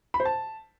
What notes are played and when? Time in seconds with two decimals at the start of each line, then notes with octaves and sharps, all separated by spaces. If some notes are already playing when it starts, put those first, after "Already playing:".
0.14 B5
0.20 C5
0.25 A5